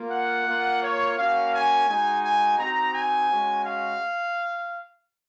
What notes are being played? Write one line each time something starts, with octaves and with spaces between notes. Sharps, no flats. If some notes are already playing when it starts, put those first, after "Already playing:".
Already playing: A#3 F4
F#5
A#3 F4
C#5
A#3 C#4 F#4 F5
G#5
G#3 D#4 F#4 G#5
G#5
C4 D#4 F#4 A#5
G#5
G#3 C#4 F#4
F5